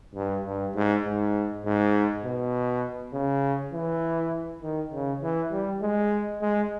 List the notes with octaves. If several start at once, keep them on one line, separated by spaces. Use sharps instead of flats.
G2
G2
G#2
G#2
G#2
B2
C#3
E3
D#3
C#3
E3
G3
G#3
G#3